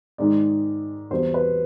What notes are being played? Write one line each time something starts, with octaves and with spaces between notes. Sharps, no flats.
G#2 D#3 G#3 D5
E2 B2 G3 C4 C5
B4